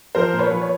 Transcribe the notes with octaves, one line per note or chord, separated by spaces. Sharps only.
F3 A#4 C5
A#2
B4 C#5
F3
C#5